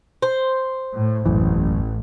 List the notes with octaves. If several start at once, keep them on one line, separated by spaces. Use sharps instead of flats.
C5
A2
E1 A1 F#2 E3